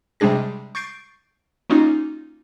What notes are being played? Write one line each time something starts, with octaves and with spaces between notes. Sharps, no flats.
C3 G3 G#3 D4 G#4 A#6
C#6 G6 A6 C7 D7
A#3 C#4 D#4 F4 F#4